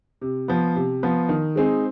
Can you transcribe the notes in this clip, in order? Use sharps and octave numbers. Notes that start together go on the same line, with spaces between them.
C3
F3 B3
C3
F3 B3
D#3
G#3 C4 D#4 G#4